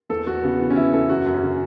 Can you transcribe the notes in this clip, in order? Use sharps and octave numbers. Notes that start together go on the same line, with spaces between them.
E2 A4
E2 F#4
C#3 B3
E3 B3
C#4
E3 E4
E2 A4
F#2 F#4
F#2
C#4
C#3